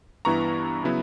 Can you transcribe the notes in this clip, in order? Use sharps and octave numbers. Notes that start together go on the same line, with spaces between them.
G2 E3 B3 E4 A#5 C#6
C#3 F#3 B3 E4